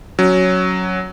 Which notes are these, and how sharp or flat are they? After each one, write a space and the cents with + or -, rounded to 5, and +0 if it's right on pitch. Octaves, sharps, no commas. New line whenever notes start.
F#3 +0 C#4 +0